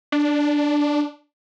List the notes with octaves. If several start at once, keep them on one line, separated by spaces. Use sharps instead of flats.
D4